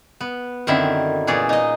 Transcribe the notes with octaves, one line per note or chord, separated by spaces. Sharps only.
B3
F#2 D3 D#3 C4 E4 E5
E2 A#2 G#4 C#5 D5
D#4 D#5